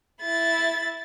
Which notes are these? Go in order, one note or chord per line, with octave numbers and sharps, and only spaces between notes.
E4 A6